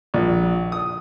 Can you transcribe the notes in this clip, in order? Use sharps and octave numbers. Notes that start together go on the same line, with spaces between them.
A#1
D#6